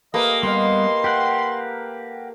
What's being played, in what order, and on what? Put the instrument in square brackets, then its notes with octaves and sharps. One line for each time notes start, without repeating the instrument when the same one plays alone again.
[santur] A3 G4 B4 [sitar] A#3 [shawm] D#5
[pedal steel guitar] G3 B3 [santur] D#5 F5 [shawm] C6
[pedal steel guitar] G4 A#4 F#5 [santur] G5